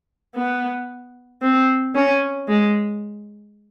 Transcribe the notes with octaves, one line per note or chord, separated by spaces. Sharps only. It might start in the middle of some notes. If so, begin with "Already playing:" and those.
B3
C4
C#4
G#3